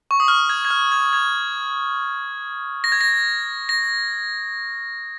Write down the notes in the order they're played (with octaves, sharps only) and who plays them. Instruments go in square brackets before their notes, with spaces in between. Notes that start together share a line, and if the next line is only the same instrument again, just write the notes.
[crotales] C#6
D#6
F6
G#6
G#6
F6
G#6
G#6
A#6
G#6
A#6
A#6